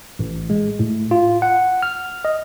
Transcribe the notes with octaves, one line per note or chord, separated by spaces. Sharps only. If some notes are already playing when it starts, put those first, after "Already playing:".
A1
G#3
A2
F4
F#5
F6
D#5